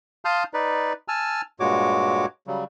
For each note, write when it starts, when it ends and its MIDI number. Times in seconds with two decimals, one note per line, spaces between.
0.25 0.44 77
0.25 0.44 81
0.25 0.44 84
0.25 0.44 87
0.25 0.44 89
0.25 0.44 91
0.54 0.93 63
0.54 0.93 71
0.54 0.93 74
1.08 1.41 80
1.08 1.41 81
1.08 1.41 88
1.08 1.41 89
1.60 2.26 43
1.60 2.26 46
1.60 2.26 56
1.60 2.26 66
1.60 2.26 73
1.60 2.26 86
2.47 2.64 49
2.47 2.64 54
2.47 2.64 55